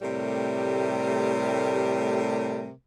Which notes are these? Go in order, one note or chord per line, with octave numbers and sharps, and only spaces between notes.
A2 C3 G3 A3 G4 A#4